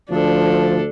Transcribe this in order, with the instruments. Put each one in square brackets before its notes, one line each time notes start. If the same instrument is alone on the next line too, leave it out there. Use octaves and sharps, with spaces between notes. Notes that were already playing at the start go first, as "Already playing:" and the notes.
[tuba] D2 [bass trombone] F3 [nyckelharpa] D4 A4